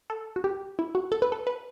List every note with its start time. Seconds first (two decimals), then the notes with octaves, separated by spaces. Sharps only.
0.10 A4
0.36 F#4
0.44 G4
0.79 E4
0.95 F#4
1.12 A4
1.22 B4
1.32 A4
1.47 B4